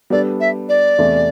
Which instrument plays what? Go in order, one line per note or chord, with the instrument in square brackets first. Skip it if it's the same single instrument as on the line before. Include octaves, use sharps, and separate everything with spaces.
[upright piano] G3 B3 D4 A4 [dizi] D5
[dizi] E5
D5
[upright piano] E2 C3 E3 A3